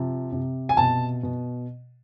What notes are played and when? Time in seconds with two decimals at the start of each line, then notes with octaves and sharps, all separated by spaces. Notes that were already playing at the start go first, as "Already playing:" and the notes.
Already playing: C3 F3
0.32 C3
0.69 G#5
0.77 B2 A5
1.23 B2